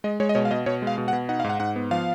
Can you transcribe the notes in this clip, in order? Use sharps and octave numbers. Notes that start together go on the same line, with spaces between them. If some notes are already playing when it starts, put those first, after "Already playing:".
G#3 D#5
G#3 C#5
D#5
B2 C#5
F5
B2 D#5
B2 C#5
G#3
F5
B2
F#5
B2
D#4 F#5
G#2 F5
F#5
G#2 F#5
B3
F3 F5